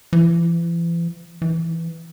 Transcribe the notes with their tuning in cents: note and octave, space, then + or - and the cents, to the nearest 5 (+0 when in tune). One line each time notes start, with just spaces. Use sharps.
E3 +40
E3 +5